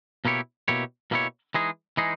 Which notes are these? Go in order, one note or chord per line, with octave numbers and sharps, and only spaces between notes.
B2 A#3 E4 G4 C#5
B2 A#3 E4 G4 C#5
B2 A#3 E4 G4 C#5
E3 G#3 D#4 G#4
E3 G#3 D#4 G#4